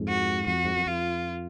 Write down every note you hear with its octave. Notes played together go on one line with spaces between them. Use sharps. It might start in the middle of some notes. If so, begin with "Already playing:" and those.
Already playing: F2 G#2
F#4
F2 F#4
G#2
F#2
F2 F4